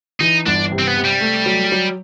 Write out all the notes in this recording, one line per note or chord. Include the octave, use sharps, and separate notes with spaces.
E3 D#4
G1 D4
C3
C4
B3
C3
G3
A3
F#3
F#3